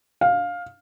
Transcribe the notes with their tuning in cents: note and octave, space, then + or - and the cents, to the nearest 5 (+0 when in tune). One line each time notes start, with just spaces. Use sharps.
F5 +15